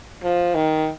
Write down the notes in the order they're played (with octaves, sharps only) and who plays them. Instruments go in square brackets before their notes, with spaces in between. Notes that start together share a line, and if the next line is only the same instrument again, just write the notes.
[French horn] F3
D#3